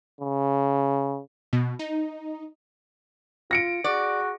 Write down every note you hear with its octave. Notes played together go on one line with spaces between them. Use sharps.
C#3
B2
D#4
F4 A#6 C#7 D7
F#4 G#4 D5